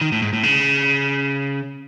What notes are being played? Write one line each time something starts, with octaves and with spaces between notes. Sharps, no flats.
D#3
A2
G#2
A2
C#3